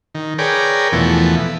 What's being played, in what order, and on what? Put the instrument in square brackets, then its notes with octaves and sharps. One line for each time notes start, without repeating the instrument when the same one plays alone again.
[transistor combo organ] D#3
G#4 A#4 B4 C#5 D5 G5
E2 B2 E3 F3 A3 B3
B4